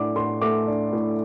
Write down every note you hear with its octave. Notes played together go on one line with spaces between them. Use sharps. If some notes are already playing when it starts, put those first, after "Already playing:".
Already playing: A2 D4 D6
A2 C6
A3 D6
D4
A2